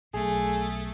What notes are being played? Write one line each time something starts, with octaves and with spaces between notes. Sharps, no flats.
B1 A3 G#4